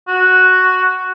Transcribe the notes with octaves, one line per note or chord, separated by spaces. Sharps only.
F#4